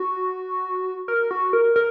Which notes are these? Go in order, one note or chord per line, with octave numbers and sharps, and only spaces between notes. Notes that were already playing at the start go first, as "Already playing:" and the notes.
Already playing: F#4
A#4
F#4
A#4
A#4